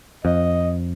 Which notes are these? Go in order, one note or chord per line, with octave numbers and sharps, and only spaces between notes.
F2 D#5